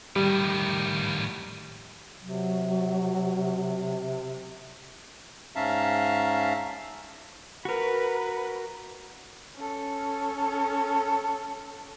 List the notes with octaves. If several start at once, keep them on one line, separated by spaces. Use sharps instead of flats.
A2 D#3 G3
C3 F#3
G#2 C#4 E5 F5 A5 A#5
F#4 A#4 B4
C#4 A4